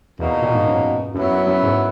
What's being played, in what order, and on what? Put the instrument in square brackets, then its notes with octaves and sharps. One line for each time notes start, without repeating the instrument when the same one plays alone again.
[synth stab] E2 [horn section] B2 A#3 D#4 F#4
[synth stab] A#2
G#2
F#2
[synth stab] F#2 [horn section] F#3 B3 E4
[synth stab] F#2
F#2
G#2